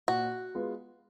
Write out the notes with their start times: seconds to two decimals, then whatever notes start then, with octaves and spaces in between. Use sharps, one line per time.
0.08 A#2 F#4
0.55 G#3 B3 F4 B4